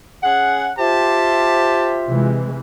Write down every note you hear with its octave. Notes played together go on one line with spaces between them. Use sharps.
C#4 G#4 F#5
F4 G4 C5 E5 A5
C3 E3 G#3